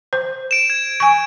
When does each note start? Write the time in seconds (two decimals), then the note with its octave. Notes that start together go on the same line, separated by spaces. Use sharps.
0.13 C5
0.51 D7 E7
0.70 G#6 E7
1.00 G#5 C#6 D7